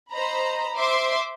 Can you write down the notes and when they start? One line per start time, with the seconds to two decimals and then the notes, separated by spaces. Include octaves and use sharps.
0.11 C5 D#5 A#5 B5
0.76 C5 E5 C6 D6